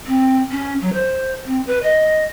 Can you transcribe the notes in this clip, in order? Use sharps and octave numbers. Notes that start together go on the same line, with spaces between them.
C4
C#4
F#3
C5
C4
B4
D#5